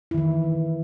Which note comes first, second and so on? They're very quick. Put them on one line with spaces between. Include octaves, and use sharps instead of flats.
E4 D#3 E3